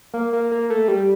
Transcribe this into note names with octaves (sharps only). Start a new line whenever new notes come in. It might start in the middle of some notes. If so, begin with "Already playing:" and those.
A#3
A#3
A#3
A3
G3